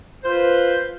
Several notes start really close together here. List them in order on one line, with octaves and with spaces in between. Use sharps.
C5 F4 B4